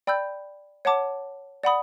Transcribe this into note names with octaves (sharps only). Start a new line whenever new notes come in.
D5 G5 B5 E6 G6
C#5 F#5 A5 D6
D5 F#5 B5 D#6